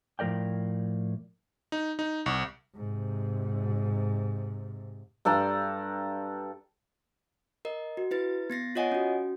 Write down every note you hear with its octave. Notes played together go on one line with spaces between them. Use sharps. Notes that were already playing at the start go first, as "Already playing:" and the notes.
A2 F3 A#4 D5 G5
D#4
D#4
C2
G#2 C3
G2 A4 D5 A#5
A#4 D#5
F#4
E4 B4 A6
B3 A6 A#6 C7
F4 C#5 D#5 F#5 G#5
C#4 F#4